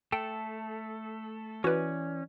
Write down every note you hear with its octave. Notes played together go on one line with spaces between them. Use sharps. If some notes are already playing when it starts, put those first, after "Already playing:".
A3 A4 G5
E3 C#4 F#4 B4 D5